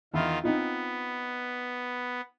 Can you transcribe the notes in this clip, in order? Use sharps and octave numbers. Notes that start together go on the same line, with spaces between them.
E2 D#3 F4 E5 B5
B3 C4 D#4 F4